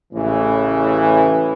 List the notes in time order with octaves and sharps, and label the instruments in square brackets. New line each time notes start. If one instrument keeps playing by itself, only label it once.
[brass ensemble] A1 C#3 E3